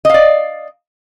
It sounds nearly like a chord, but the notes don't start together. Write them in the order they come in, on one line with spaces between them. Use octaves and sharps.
D#5 F5 D5